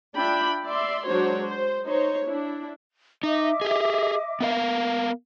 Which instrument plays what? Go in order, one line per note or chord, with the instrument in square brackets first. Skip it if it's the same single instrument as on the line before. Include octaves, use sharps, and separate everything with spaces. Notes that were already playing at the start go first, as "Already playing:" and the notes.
[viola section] D4 F4 E5 G5 B5
D5 E5 C6
F#3 G#3 D4 F#4 C5 C#5
C5
D#4 C5 C#5
D4 E4
[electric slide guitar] D#4 [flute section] D#5 E5 D6
[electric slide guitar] G4 G#4
B3 A#4 F5